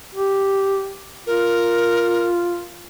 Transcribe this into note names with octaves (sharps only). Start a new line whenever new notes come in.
G4
F4 A#4